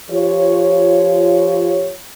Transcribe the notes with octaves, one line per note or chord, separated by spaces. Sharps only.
F3 F4 G4 C#5